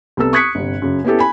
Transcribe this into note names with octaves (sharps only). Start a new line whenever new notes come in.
C2 B3 A4 E6
C#6 D#6 F#6 G#6 B6 C#7
G1 C3
F#2 C#3
B3 C#4 E4 G4 A4
G#5 B5